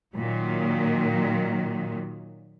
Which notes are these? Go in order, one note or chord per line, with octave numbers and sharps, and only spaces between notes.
A#2 D#3 F#3